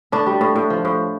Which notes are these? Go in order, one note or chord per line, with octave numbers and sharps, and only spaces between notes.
A2 D4
G3
A2
A2
F3
A2